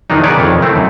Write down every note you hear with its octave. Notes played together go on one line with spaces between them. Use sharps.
E2 D#3 F#3 D4 D#4
G#4 B4 C#5 D5 A5
F2 D#3
A3 C4 E4
F#2